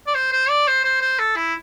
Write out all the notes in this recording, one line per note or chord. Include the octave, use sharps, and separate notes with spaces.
D5
C5
C5
D5
C5
C5
C5
A4
E4